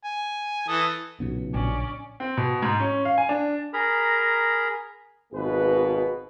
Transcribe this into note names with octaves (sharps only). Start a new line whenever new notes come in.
G#5
E3 A4 D#6
B1 A#2 C#3 B3
A#1 C#4 D5
C4
B2
G#2
C#4
F5
G#5
D4
G#4 A#4 A#5 B5
G#1 B2 A#3 G#4 B4